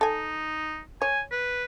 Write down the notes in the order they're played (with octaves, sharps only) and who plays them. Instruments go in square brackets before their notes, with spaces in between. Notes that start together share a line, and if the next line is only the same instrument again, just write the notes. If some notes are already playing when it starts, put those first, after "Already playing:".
[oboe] D#4 [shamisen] A4 G#5
[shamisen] C#5 [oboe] G#5
[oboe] B4